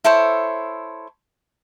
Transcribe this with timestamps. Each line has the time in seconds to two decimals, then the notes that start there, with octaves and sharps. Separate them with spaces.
0.04 E4 A4 C5 C#5